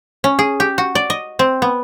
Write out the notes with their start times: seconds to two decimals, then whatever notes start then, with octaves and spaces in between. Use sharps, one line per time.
0.24 C#4
0.39 G#4
0.60 G4
0.78 F#4
0.95 D5
1.10 D#5
1.39 C4
1.62 B3